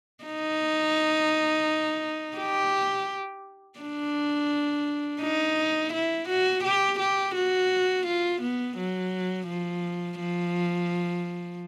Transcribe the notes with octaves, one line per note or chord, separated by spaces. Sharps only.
D#4
G4
D4
D#4
E4
F#4
G4
G4
F#4
F4
B3
F#3
F3
F3